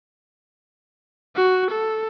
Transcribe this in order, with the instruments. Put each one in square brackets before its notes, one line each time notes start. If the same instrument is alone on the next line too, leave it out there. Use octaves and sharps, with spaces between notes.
[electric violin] F#4
A4